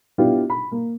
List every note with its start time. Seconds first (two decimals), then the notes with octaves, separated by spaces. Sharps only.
0.18 B3 D4 E4 F4 G4
0.50 B5
0.72 A#3